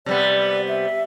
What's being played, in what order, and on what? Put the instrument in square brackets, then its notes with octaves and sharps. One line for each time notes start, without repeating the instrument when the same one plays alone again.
[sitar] C3 G3 B3 [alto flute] D5
[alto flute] E5